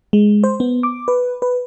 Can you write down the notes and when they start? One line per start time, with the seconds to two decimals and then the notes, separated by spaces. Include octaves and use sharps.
0.13 G#3
0.44 C5
0.60 B3
0.83 D6
1.08 B4
1.42 B4